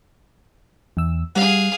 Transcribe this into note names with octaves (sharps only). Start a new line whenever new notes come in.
E2 E6
G3 G#4 F5 F#5